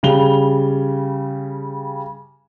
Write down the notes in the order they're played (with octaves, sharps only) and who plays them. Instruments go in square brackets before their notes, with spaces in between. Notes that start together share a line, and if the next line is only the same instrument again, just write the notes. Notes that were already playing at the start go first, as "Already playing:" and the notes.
[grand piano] C#3 G3 F7 G7